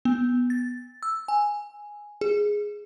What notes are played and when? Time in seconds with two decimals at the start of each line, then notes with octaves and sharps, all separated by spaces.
0.05 B3
0.50 A6
1.03 E6
1.28 G#5
2.21 G#4